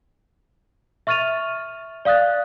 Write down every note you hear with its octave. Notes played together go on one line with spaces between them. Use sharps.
E5 C#6 F6 A6 D#7 F7
D5 F5 D#6 F#6 A6